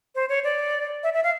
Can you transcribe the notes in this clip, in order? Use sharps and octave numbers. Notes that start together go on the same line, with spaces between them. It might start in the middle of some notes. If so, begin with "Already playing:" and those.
C5
C#5
D5
E5
E5
F5